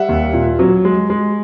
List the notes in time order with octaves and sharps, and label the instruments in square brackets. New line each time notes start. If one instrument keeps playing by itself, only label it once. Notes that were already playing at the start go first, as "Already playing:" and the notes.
Already playing: [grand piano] G3 E5 F#5
D#2
A#2
F#3
G#3
G#3